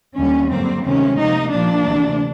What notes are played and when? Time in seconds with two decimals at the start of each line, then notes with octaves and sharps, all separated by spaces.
0.16 D#2 D3 G3 C#4
0.49 G2 D3 F#3 A#3 C4
0.84 D2 C3 D#3 G#3 C4 C#4
1.17 C3 F3 A#3 D#4
1.51 A#2 F3 A#3 D4
1.85 D2 C3 E3